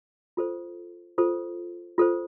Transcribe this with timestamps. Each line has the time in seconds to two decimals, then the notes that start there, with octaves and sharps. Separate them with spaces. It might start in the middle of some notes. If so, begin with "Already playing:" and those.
0.37 F4 A4 C5
1.18 F4 A4 C5
1.98 F4 A4 C5